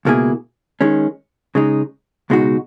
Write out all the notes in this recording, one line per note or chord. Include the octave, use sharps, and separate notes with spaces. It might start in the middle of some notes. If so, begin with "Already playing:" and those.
C#2 B2 A#3 E4 G#4
D#3 G#3 C#4
C#3 G#3 D#4
C#2 B2 G#3 D#4 F#4